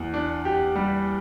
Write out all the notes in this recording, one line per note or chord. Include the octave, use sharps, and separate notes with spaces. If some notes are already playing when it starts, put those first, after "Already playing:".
Already playing: E2
D4
G4
G3